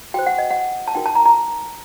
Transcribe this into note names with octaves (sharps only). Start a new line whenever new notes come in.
F#4 C5 G5
F#5
D#5
F#5
A5
D#4 F#4 A#4 G5
A5
A#5
A#5